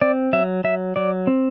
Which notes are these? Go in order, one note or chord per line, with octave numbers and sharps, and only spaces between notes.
C4 D5
F#3 E5
F#3 E5
F#3 D5
C4